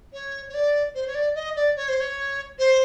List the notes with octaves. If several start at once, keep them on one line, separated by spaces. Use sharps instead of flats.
C#5
C#5
D5
C5
C#5
D5
D#5
D5
C#5
C5
C#5
C5